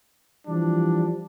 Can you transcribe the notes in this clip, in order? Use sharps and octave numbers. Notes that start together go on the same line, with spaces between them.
E3 F3 G3 D4